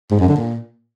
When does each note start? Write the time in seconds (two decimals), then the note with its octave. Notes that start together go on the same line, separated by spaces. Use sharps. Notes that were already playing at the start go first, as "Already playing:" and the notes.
0.11 G#2
0.20 F#2
0.28 D3
0.37 A#2